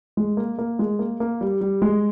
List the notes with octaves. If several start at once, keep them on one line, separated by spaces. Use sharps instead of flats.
G#3
A#3
A#3
G#3
A#3
A#3
G3
G3
G#3